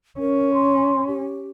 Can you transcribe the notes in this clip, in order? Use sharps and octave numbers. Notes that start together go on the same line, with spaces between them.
C#4 A#4
C6
G4